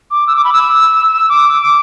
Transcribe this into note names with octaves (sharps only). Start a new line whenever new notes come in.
D6
E6
D6
B5
E6
D6